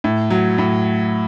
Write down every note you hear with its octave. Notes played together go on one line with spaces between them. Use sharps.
A2
F#3
A2